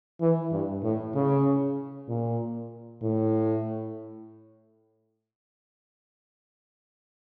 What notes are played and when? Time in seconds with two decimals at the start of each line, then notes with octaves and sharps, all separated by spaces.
0.21 E3
0.52 G2
0.83 A2
1.15 C#3
2.09 A#2
3.02 A2